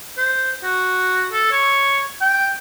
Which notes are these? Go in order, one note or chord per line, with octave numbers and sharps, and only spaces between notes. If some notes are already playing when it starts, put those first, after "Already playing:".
C5
F#4
A4
C#5
G5